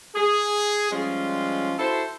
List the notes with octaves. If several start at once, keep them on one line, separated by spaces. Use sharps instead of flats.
G#4
F3 G3 G#3 C#4 F4
E4 F#4 A4 C5